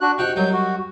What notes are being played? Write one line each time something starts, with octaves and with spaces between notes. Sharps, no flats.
D4 F#4 F#6
C3 D#4 F#4 G5 F#6
F#2 F#3 G3 D#5 G6
F#4